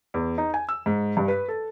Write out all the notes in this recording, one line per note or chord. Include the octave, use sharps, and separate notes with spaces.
E2
D#4
G#5
E6
G#2
G2
B4
A4